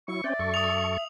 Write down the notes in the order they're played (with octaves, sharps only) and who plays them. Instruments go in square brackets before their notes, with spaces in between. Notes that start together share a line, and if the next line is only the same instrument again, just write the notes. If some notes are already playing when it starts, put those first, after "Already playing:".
[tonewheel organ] F#3 E4 [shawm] C#6
[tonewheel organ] C4 C#4 G5 [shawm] D5 [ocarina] E5
[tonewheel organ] F#2 A4 C#6
[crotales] D#6 F7